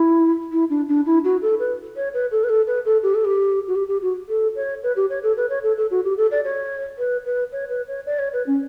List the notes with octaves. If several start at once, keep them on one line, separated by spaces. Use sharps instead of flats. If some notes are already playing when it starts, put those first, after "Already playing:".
Already playing: E4
E4
D4
D4
E4
F#4
A4
B4
C#5
B4
A4
B4
A4
B4
A4
G4
A4
G4
F#4
G4
G4
F#4
A4
C#5
B4
G4
C#5
A4
B4
C#5
A4
A4
F#4
G4
A4
D5
C#5
B4
B4
C#5
B4
C#5
D5
C#5
B4
C#4